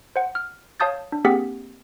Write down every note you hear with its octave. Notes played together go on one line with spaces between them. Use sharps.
C5 F#5
F6
C#5 F5 A5 D#6 G6 A6
D4
A#3 C4 G4 G#4 F#5 B6